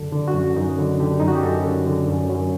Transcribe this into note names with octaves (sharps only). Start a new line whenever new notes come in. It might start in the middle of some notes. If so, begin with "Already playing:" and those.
Already playing: F#2 D3 A4
D3
F#4
F#2
F#2 D#4
D3
D3 G4
F#2 D#4
F#4
G4
F#2 A4
D3
D3
F#2
F#2